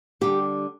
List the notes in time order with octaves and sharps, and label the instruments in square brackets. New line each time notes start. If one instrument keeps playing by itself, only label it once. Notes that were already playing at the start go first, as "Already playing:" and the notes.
[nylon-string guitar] D3 G3 D4 G4